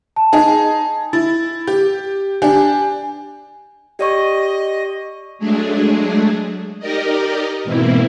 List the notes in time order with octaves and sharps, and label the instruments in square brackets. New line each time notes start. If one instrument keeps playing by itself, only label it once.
[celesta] A5
[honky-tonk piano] D#4 G#4
[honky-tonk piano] E4 [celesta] A6
[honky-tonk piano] G4
[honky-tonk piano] D4 G4 [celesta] G#5
[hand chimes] G4 D5 C#6 [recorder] D#5
[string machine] F#3 G#3 A3 D4 G#4
D#4 G4 A#4 D5 D#5
G#2 B2 E3 A#3 C4 E4